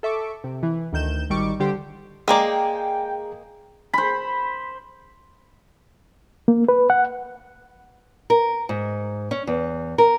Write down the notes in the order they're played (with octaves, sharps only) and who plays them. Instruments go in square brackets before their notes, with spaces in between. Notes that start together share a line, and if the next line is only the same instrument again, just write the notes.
[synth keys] A4 E5 C#6 D6
C3
E3
D2 D#3 G6 E7
G#1 D#3 G3 C#6 D6
D3 G3 G4 C5
[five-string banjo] G#3 A#3 D5 [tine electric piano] G#4 A#5 [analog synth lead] G5
[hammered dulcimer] C5 B5
[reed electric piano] A#3
B4
F#5
[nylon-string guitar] A#4
G#2
C#4
E2
A#4